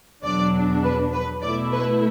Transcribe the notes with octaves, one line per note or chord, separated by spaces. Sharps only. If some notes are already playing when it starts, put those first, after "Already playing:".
E2 B2 F#3 D4 D5
B4
B4
B2 A3 E4 D5
B4